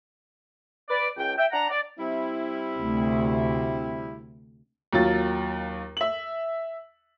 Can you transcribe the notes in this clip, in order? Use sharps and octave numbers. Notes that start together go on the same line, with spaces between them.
B4 D5
C#2 G5
E5 G5
D4 F#5 A#5
D5
G3 C4 E4
D2 C3
D#2 F#3 F4 A6
E5 F#7